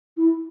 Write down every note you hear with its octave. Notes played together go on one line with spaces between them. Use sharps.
E4